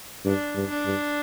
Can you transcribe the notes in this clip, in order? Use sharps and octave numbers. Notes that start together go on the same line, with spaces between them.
G2 D4
G2
D4
G2